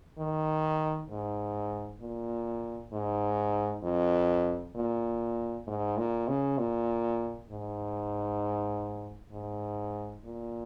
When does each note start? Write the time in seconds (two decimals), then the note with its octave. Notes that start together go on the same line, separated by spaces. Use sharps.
0.19 D#3
1.10 G#2
2.01 A#2
2.92 G#2
3.83 F2
4.75 A#2
5.67 G#2
5.97 A#2
6.28 C#3
6.58 A#2
7.49 G#2
9.32 G#2
10.24 A#2